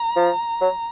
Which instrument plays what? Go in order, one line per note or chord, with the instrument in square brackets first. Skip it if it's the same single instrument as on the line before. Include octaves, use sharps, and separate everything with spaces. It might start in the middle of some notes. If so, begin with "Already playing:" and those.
Already playing: [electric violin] A#5
[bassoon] F3
F#3